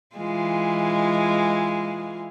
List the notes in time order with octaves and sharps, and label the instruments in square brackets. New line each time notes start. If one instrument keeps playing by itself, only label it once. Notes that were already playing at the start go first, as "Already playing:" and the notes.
[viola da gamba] E3 G#3 F4